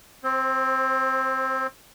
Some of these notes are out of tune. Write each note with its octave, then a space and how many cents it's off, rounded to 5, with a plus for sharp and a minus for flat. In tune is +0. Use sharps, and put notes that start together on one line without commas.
C4 +0 C5 +30